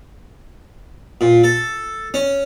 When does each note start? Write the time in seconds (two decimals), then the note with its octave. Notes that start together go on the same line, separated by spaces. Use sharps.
1.21 A#2
1.44 A4
2.14 C#4